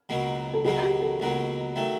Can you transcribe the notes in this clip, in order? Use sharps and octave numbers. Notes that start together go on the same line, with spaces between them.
C#2 B2 F#3 A#3
A4
C#2 B2 F#3 A#3 G#4
G4
A4
C#2 B2 F#3 A#3
D#3 F#3 A3